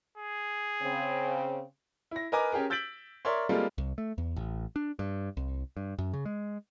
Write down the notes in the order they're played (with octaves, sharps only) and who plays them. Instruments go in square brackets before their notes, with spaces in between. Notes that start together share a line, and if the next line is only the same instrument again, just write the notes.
[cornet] G#4
[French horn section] C#3 C4
[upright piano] E4 A#6
A#4 B4 D#5 G#5 A#5 D6
C#4 G4 G#4 A#4
E6 G6 A6 B6 D7 F#7
A#4 C#5 D5 E5 C6
G3 G#3 A#3 C4 F4 A4
[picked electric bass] C2
A3
E2
A1
D4
G2
C2
G2
F#2
C#3
G#3